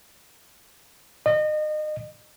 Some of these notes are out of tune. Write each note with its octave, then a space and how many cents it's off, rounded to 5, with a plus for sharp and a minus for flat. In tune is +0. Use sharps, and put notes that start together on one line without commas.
D#5 -30